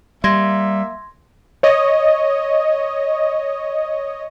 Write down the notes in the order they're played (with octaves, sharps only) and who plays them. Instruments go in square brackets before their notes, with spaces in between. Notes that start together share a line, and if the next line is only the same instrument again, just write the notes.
[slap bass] G3 [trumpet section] A#3 E5 [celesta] C6 G#6 A#6
[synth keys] C#5 D#5